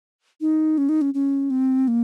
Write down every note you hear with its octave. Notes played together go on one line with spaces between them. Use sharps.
D#4
C#4
D#4
C#4
C#4
C4
A#3